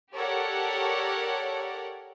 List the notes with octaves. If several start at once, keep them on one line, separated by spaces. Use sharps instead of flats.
G4 A4 A#4 C#5 D5 F#5